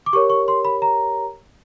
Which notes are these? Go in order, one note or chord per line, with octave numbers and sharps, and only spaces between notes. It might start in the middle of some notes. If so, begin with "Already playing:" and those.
D6
G4 A#4 C#5 C#6
C#6
C6
B5
A#5